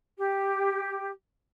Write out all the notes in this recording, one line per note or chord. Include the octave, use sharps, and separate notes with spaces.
G4